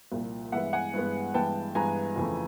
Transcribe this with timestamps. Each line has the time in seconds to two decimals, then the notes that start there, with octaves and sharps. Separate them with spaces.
0.12 C2 A#2 F3
0.52 G2 E3 G#3 B3 E5 F#5
0.73 F#5 G#5
0.94 G2 E3 G#3 B3
1.34 G2 E3 G#3 B3 G5 A5
1.75 G2 E3 G#3 B3 G#5 A#5
2.16 F2 C#3 E3 A3